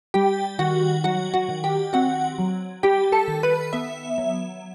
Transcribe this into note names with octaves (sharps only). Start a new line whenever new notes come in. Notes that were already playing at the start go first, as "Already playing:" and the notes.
G3 G4 G5
D#3 F#4 F#5
F#3 F#4 F#5
F#4 F#5
D#3
G4 G5
C4 F#4 F#5
F#3
G3 G4 G5
A4 A5
D#3
B4 B5
B3 E5
F#3